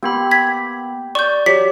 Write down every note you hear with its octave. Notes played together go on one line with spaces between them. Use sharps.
A#3 B3 G4 B5
G#6 B6
D5 C#6 G6
F#3 G4 B6